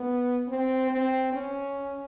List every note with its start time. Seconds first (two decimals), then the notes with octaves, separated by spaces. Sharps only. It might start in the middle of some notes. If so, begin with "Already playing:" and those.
Already playing: B3
0.48 C4
0.91 C4
1.33 C#4